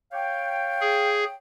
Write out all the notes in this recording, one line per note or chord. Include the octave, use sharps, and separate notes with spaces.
C#5 F5 G5
G#4